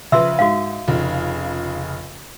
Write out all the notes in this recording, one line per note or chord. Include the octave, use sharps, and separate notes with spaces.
C#3 F3 B4 E5 C6 E6
G#2 F#4 F5
F1 C#3 F4